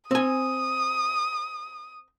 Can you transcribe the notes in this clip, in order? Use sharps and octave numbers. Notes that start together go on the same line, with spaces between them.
C4 G#5 D#6